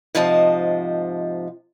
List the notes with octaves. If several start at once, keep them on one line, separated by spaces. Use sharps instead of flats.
G#2 C3 F3 D#5 A5